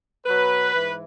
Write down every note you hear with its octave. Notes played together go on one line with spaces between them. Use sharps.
B2 F#3 B4
G#2 E3